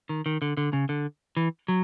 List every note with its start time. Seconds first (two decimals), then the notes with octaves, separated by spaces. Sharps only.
0.09 D#3
0.26 D#3
0.42 D3
0.57 D3
0.73 C#3
0.89 D3
1.37 E3
1.68 F#3